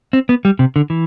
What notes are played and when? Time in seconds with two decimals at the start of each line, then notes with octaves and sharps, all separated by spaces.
0.13 C4
0.29 B3
0.45 G3
0.59 C3
0.76 D3
0.90 E3